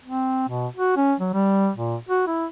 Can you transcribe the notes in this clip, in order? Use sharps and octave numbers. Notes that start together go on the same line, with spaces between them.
C4
B2
F#4
C#4
F#3
G3
A#2
F#4
E4